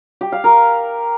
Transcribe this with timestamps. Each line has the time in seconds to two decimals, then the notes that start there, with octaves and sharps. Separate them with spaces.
0.21 G4
0.32 F5
0.44 A#4